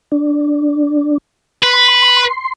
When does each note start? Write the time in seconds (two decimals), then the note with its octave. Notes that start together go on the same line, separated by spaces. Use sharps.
0.12 D4
1.62 B4 C6